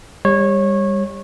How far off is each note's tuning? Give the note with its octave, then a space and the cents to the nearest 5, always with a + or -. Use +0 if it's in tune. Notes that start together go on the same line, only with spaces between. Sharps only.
G3 +30 C#5 -20